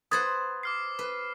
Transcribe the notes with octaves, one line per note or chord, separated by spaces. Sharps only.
B4 C5 F#5 D#6 G#6 A6
D6 F6 C7
B4